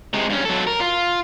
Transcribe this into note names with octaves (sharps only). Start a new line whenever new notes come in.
C3 G#3
G2 C#4
F#3 A4
A#4
F4